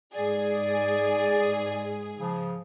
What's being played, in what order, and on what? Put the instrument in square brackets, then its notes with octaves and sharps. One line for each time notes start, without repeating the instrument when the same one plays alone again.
[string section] G#2 G#4 [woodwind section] D5
[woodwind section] C#3 F3